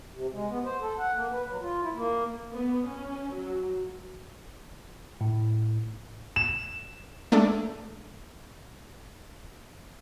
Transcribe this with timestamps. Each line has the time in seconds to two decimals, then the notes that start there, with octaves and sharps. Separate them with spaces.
0.13 C3
0.33 G#3
0.48 B3
0.64 C5
0.81 A4
0.98 F#5
1.14 A#3
1.31 B4
1.48 F#3
1.60 F4
1.81 E4
1.94 A#3
2.53 B3
2.88 C#4
3.33 F#3
5.21 A2
6.36 E7
7.32 G#3 A3 D4 A4 D5